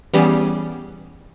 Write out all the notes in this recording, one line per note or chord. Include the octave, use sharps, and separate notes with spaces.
E3 G3 B3 C#4 G4 G#4